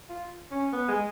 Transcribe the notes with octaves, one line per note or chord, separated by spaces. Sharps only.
F4
C#4
B3
G#3